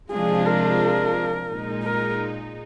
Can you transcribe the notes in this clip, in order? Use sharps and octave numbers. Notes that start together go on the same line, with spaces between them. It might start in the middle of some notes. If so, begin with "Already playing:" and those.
C3 F3 G#3 D4 F4 G#4
A#4
A#2 G#3 D#4
A#4